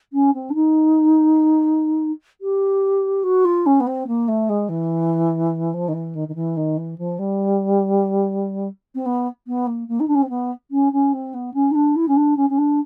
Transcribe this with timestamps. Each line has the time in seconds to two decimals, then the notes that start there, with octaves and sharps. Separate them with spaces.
0.13 C#4
0.34 C4
0.50 D4
0.54 D#4
2.41 G4
3.23 F#4
3.45 F4
3.66 C#4
3.80 B3
3.87 C4
4.07 A#3
4.28 A3
4.49 G#3
4.69 E3
5.74 F3
5.88 D#3
5.93 E3
6.15 D#3
6.28 D#3
6.35 E3
6.57 D#3
6.77 E3
6.98 F3
7.19 G3
8.95 C4
9.06 B3
9.47 B3
9.67 A#3
9.88 A#3
10.00 D#4
10.08 D4
10.15 C#4
10.22 C4
10.29 B3
10.71 C#4
10.92 C#4
11.13 C4
11.34 B3
11.54 C#4
11.71 D#4
11.75 D4
11.96 E4
12.08 C#4
12.16 D4
12.37 C#4
12.50 C#4
12.58 D4